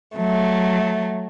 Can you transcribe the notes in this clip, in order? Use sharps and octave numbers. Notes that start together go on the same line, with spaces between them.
F#3 A3